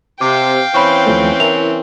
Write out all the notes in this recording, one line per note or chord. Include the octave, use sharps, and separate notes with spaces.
C3 F5 G5 D6
E3 C4 C#4 B5 C#6
D#2 F3 A3
E4 A#4 F7